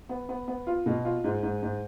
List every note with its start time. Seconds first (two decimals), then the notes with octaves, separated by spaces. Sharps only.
0.09 B3
0.29 B3
0.48 B3
0.67 F4
0.86 B2
1.05 F4
1.24 G#2
1.43 G#2
1.62 G#2